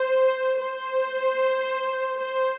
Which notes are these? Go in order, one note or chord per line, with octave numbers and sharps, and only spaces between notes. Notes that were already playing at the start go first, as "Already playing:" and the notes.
Already playing: C5
C5
C5